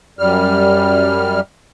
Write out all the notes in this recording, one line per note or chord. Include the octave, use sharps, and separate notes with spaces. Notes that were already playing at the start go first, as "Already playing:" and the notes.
F#2 G3 F6